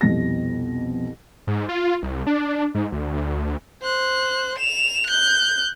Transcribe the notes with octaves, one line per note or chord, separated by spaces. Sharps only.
C2 F2 B2 A#6
G#2
F4
C2
D4
G#2
D2
D2
C5 F#6
E7 F7
F#6 G6